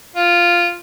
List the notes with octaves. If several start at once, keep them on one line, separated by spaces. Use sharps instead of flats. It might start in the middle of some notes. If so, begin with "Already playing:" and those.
F4